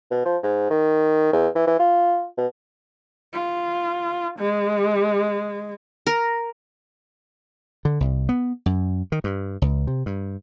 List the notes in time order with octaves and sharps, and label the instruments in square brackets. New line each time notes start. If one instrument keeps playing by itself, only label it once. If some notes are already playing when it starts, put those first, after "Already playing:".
[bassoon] B2
F3
G#2
D#3
E2
E3
E3
F4
B2
[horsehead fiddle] F4
G#3
[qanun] A#4
[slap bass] D3
C2
B3
F#2
D#3
G2
C#2
C3
G2